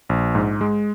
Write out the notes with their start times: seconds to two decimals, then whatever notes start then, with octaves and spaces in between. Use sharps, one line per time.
0.09 A#1
0.35 G#2
0.61 G#3